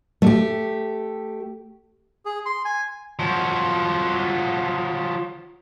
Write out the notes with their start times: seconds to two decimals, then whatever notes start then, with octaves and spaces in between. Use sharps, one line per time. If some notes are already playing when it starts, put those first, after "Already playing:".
0.22 A3 G4
2.25 G#4
2.46 C6
2.65 G#5
3.19 F3 F#3